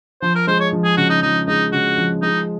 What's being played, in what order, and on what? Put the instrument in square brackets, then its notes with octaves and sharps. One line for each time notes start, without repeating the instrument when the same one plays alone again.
[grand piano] F3 [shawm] C5
[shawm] A#4
[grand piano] G#3 [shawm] C5
[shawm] C#5
[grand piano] F3
[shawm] G#4
[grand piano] C#3 [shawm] F#4
[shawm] D#4
[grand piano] F3 [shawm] D#4
[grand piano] G#3 [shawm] D#4
[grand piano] C#3 [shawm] F#4
[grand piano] F3
[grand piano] G#3 [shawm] D#4